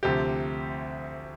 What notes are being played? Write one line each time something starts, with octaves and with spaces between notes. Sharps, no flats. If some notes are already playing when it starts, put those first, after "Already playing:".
D2 C3 F3 C4 G4